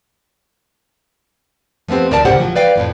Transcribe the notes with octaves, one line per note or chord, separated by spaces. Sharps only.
F3 A3 B3 C4 G4
D2 A#4 D5 A5
D2 A2 C#3 G4 C5 F#5
F3 F#3
B4 D5 F5 G5
F2 A2 F#3